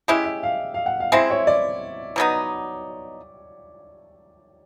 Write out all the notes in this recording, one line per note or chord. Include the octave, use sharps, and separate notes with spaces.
G#3 C#4 E4 G4 E5
E5
F5
F5
F#5
F5
G#3 C4 E4 E5
C#5
D5
B2 F#3 B3 D#4